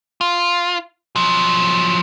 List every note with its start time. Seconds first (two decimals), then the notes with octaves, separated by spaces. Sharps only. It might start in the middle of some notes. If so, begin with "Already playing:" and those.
0.21 F4
1.16 F3 F#3